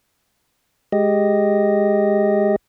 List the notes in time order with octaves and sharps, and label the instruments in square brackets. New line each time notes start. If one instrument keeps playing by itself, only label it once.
[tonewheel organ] G#3 G4 D#5